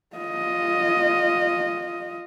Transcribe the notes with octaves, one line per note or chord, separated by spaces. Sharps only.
F4 D#5